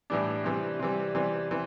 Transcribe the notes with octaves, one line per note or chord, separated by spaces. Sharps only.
A2 E3 G3 D4
C3 E3 G3
C3 E3 G3
C3 E3 G3
C3 E3